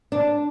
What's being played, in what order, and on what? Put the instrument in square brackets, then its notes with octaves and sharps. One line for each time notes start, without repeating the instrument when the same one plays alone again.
[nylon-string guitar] D4